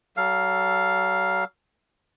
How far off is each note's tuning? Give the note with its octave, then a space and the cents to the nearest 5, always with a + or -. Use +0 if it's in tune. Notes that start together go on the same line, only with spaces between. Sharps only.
F#3 +40 A4 +0 F5 +0